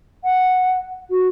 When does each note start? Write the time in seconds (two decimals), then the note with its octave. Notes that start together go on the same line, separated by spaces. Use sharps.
0.24 F#5
1.11 F#4